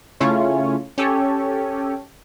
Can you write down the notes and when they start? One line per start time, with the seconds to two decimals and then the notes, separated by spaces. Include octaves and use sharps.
0.20 C#3 A3 C#4 E4 F4 C#5
0.98 C#4 G4 A4 C#5